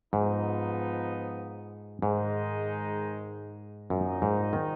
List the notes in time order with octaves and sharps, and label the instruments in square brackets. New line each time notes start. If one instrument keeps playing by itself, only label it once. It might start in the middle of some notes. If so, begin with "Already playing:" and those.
[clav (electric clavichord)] G#2 [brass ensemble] F3 B3 D#4
[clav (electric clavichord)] G#2 [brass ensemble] D#3 G#3 D#4
[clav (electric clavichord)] F#2 [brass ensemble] A#2 F3 A#3 D#4
[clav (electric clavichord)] G#2
D#3